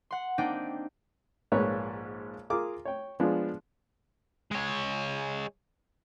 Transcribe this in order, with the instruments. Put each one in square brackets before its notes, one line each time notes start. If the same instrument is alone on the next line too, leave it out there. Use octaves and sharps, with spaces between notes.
[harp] F#5 C6
A#3 C4 D4 D#4 G5
[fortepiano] A#1 G#2 A#3 B4 C#5
F4 G#4 A#4 D6
C#5 G5
F3 G#3 B3 D4
[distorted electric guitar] G#3 C#5